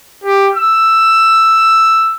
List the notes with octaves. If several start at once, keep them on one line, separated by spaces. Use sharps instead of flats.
G4
E6